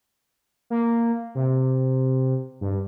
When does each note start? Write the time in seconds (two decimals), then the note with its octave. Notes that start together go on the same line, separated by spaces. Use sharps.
0.70 A#3
1.35 C3
2.61 G2